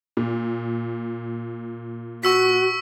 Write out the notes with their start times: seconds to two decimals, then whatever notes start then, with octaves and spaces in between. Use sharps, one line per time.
0.17 A#2
2.23 F#4 C#6 E6 B6